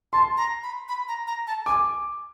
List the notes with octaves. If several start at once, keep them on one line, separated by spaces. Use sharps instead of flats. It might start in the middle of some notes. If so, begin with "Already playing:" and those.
A5 C6
A#5
B5
B5
A#5
A#5
A5
G#5 D6